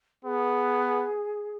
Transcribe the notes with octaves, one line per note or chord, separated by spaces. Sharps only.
B3 G#4